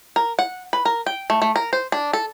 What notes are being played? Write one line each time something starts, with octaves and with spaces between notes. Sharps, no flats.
A#4
F#5
B4
A#4
G5
A3
A3
A#4
C5
D4
A4